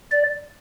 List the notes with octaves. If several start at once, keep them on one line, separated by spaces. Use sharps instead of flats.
D5